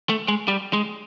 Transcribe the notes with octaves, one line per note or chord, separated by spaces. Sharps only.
A3
G#3
G3
G#3